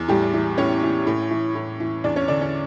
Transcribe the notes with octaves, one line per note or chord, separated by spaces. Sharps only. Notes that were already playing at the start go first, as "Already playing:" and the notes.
Already playing: E2
A2 G3 G4
E3
A2 C#4 C#5
E3
A2
E3
A2
E3
E2 D4 D5
C#4 C#5
D3 D4 D5
C#4 C#5